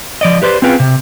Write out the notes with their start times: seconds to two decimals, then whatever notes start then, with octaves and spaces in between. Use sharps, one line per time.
0.21 F3 D5 D#5
0.42 G4 B4 C5 D5
0.62 C4 C#4 F4 G#4 B4 G5
0.80 C3